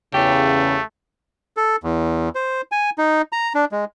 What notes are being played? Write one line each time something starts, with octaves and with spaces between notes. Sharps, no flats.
E2 C#3 A3 G4
A4
E2
C5
G#5
D#4
A#5
D4
G#3